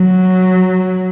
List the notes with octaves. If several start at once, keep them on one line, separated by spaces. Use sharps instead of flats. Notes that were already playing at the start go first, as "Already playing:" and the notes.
Already playing: F#3